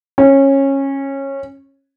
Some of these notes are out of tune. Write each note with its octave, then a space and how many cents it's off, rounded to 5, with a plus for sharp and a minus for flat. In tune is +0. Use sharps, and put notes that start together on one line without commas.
C#4 -20